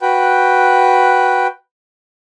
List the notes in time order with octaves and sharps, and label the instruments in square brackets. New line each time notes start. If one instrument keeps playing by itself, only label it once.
[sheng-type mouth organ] F#4 B4 G5